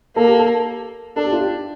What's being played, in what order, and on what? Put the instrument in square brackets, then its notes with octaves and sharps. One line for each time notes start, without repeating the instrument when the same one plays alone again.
[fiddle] A#3 [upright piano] A4
[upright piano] G4
A4
[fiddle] D4 [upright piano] A4
[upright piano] G4
F4
G4